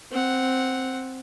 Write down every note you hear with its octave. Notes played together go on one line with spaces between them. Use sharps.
C4 F#5